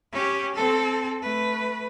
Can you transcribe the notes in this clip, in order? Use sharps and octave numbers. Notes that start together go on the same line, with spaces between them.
C#4 G4
C4 A4
A3 B4